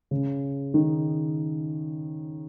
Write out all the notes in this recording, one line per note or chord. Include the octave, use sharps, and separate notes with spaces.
C#3
D#3